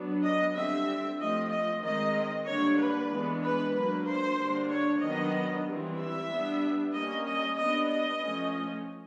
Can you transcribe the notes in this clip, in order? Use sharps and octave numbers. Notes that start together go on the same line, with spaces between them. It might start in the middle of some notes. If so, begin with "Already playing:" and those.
Already playing: F#3 B3 D4
D#5
D3 G3 C4 E5
F3 A3 C4 D#5
D#5
D#3 G#3 C4 D#5
D3 G3 A#3 D4 C#5
B4
E3 G#3 B3 D4
B4
F#3 A#3 D4 B4
C5
D3 G3 A#3 D4
C#5
D#3 F#3 B3 D4 D#5
E3 G3 C4
E5
G3 B3 D4
G3 A#3 C#4 D#5
D#5
G3 B3 D4 D#5
D#5
F3 A3 C#4